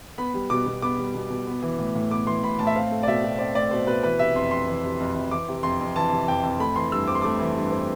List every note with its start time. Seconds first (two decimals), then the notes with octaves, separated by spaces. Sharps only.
0.18 B3 B5
0.34 G3
0.50 B2 D6
0.66 B2
0.82 B3 D6
0.99 G3
1.15 B2
1.30 B2
1.47 B3
1.62 E3
1.79 A2
1.95 A2
2.11 B3 D6
2.26 E3 C6
2.43 A2 B5
2.59 A2 A5
2.67 E5
2.75 C4 F5
2.91 A3
3.03 D5
3.07 B2 E5
3.23 B2
3.39 C4 D5
3.55 A3 D5
3.71 B2 C5
3.87 B2 B4
4.03 E3 B4
4.19 C3 E5
4.36 F2 C6
4.51 F2 C6
4.67 E3
4.84 C3
5.00 F2
5.15 F2
5.31 E3 D6
5.48 C3
5.63 F2 C6
5.80 F2
5.96 E3 A5
6.12 C3
6.28 F2 G5
6.43 F2
6.59 A3 B5
6.76 E3 C6
6.92 G2 E6
7.08 C4 D6
7.15 C6
7.22 A3 D6
7.39 E3
7.56 G2
7.72 C4